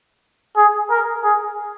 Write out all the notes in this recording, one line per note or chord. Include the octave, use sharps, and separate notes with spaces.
G#4
A#4
G#4